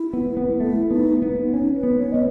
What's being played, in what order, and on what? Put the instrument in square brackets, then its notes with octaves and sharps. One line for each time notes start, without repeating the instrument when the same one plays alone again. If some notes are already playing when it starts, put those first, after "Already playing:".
Already playing: [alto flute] E4
[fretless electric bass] B3
B3
[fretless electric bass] A3 [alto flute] E4
[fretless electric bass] B3 [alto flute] D#4
[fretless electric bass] B3
[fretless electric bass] C#4 [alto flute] D#4
[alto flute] B4
[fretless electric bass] B3
[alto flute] C#5
[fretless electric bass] B3 [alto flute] D#5